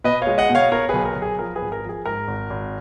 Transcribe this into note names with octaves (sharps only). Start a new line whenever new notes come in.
B2 B4 D#5
C#5 F5
G#3
D#5 F#5
B2
C#5 F5
B2 A#4 C#5
B1 G#4 B4
A#4
B1
G#4
F3 A#4
G#4 B4
G#1
A#4
F3
G#4
G#2 A#4
G#1
G#1